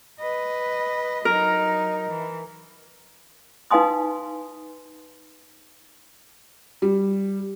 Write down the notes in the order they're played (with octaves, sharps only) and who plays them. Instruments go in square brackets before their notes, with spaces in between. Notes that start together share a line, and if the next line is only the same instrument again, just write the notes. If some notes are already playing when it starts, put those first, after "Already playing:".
[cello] B4 D#5
[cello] F#3 D#4 [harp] A#4
[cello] E3
[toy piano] D#4 B4 F5 G#5 C6 D#6
[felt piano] G3